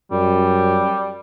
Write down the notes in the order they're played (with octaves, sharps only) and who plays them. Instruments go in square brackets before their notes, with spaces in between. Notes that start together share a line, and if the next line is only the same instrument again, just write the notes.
[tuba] F#2 [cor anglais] G3